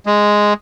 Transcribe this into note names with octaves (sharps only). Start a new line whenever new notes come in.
G#3